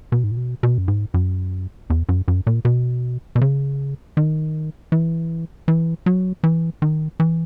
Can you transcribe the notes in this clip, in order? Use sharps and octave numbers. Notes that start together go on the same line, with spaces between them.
B2
G#2
A#2
B2
B2
F#2
G#2
F#2
E2
F#2
F#2
A#2
B2
B2
C#3
D#3
E3
E3
F#3
E3
D#3
E3